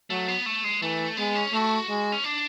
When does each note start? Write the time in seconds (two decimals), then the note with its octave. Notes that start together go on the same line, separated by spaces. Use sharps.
0.10 F#3 A3
0.28 B3
0.46 A3
0.64 G#3
0.82 E3 A3
1.17 G#3 B3
1.35 C#4
1.52 A3 F#4
1.89 G#3
2.12 C#4
2.24 D4